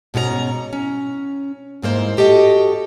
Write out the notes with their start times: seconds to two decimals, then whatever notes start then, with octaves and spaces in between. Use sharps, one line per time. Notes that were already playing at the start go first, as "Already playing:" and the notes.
0.14 G#2 B2 C#4 A4 A#5
0.73 C#4
1.82 E2 G#2 A#3 C5
2.17 F#4 G4 A4 D#5